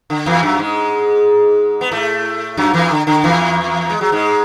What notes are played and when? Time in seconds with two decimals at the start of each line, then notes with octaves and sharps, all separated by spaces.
0.10 D3
0.26 E2 E3
0.43 F#2 F#3
0.59 G#2 G#3
1.81 B3
1.91 A2 A3
2.57 F#2 F#3
2.73 E2 E3
2.91 D3
3.07 D3
3.24 E2 E3
3.90 G#3
4.01 F#3
4.12 G#2 G#3